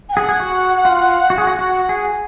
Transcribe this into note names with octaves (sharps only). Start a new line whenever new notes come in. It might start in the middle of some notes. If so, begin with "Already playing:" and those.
G#5
G#4 F#5
G#4
F#4
F4
F#4
G#4
F#4
F#4
G#4